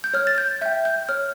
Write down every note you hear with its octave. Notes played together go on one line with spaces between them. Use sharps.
G6
C#5 F6
A6
G6
E5 G5 G6
G6
C#5 F6